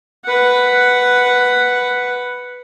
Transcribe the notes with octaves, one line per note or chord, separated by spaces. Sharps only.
B4 F#5